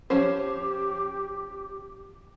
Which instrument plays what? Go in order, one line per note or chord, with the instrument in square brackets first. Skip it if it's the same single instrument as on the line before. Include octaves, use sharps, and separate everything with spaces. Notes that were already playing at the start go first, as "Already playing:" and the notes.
[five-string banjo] F3 C#4 C5 [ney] G4